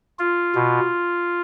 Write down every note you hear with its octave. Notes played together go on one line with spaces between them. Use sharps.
F4
B2